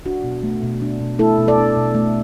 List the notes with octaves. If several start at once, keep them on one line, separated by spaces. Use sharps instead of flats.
D4 F#4
B2
A3
B2
D4
B2
A3 E4 A4
B2
A4 D5
D4
B2
A3